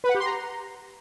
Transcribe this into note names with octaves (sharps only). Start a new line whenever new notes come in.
B4
F#5
G4
C6
A#5